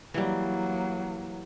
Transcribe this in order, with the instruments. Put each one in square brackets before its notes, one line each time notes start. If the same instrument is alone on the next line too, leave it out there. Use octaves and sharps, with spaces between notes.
[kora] E3 G3 [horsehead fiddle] F#3 A#3